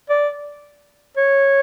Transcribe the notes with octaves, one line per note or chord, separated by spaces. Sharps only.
D5
C#5